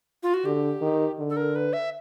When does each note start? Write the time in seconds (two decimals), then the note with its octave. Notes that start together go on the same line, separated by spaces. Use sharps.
0.23 F4
0.34 F#4
0.45 D3 G4
0.82 D#3
1.19 D3
1.30 A4
1.37 A#4
1.56 B4
1.73 E5